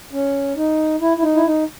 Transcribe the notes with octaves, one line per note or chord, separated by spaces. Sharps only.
C#4
D#4
E4
E4
D#4
E4
D#4